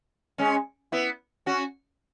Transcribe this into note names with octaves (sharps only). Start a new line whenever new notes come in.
G#3 C#4
B3 E4
C#4 F#4